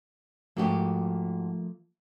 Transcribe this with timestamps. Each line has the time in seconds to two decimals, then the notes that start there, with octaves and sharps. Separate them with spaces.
0.57 G#2 F3 A3 A#3 F#4 G4